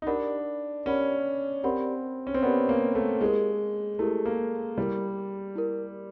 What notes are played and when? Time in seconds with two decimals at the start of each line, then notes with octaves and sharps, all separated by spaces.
0.02 D#4
0.07 D4 G4 A#4 D5 F#5 B5
0.86 C#4 G4 A#4 D5 F#5 B5
1.64 C4 G4 A#4 D5 F#5 B5
2.27 C#4
2.34 C4
2.43 B3 G4 A#4 D5 F#5 B5
2.69 A#3
2.95 A3
3.20 G#3 E4 G4 A#4
3.99 A3 E4 G4 A#4
4.26 A#3
4.78 G3 E4 G4 A#4
5.56 E4 G4 A#4